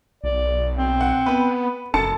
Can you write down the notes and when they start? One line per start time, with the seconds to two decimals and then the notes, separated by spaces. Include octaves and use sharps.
0.24 B1 D5
0.78 C4
1.01 F#5
1.26 B3 B4 F#5 B5
1.94 F1 F#2 A4 A5 C#7